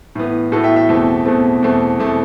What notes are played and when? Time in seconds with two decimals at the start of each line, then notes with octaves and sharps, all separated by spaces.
0.15 A2 E3 B3
0.52 A2 E3 B3 F#4 A4
0.64 E5 G5
0.76 E5 G5
0.89 E2 B2 A3 C4
1.25 E2 B2 A3 C4
1.62 E2 B2 A3 C4
1.99 E2 B2 A3 C4